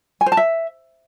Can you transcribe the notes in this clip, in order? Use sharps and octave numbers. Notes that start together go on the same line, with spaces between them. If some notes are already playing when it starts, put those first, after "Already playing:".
G#5
C5
A5
E5